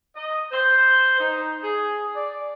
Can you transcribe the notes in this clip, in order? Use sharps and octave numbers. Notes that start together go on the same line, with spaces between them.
D#5
C5
D#4
G#4
D5